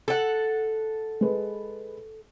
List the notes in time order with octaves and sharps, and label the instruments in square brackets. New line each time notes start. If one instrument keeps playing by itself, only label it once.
[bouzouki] A4 F#5
[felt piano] G#3 B4